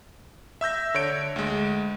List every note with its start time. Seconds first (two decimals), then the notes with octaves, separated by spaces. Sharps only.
0.61 E5 E6 G6 A#6
0.94 D3 C#5 G6 D7
1.36 D2 G#3